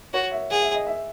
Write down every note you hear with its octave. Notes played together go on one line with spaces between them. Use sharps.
F#4 C#5
E5
G#4 F#5
E5
D#5
E5